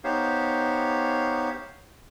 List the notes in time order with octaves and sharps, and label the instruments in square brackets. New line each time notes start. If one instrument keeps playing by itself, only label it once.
[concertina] B3 D#4 G4 C5 C#5 F5